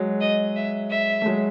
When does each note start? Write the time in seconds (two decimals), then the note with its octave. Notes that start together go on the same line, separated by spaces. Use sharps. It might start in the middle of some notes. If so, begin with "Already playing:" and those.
Already playing: F#3 G#3
0.21 D#5
0.56 E5
0.91 E5
1.22 A3
1.26 F#3 G#3